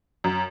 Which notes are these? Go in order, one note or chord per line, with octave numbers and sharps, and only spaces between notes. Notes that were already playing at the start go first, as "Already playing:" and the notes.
F#2